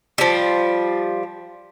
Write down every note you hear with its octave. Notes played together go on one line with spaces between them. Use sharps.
F3 G3